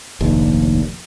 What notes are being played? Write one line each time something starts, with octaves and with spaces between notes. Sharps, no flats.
F1 A#1 D#2